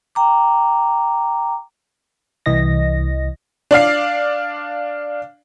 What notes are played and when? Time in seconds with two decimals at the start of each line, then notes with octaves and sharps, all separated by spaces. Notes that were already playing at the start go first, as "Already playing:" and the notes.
0.15 G5 A#5 D6
2.46 C2 E3 D#5 A#6
3.71 D4 D5 F5 C7